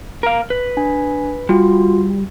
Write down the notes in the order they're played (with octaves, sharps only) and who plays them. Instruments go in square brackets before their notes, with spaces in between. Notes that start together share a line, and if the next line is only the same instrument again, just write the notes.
[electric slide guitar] A#4 F5
B4
[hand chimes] D4 G#5
[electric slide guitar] G3 [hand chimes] F4 F#4 C6